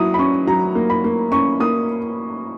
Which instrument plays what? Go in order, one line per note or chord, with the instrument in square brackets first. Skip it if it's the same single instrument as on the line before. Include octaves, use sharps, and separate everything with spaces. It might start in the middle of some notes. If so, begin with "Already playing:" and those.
Already playing: [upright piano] F#3 A#3 E4 D#6
B5
C#4 C#6
F#3 A#5
A#3
B5
A#3
C#4 C#6
A#3 D#6